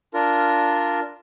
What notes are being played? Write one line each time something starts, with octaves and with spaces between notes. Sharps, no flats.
D4 F4 A#4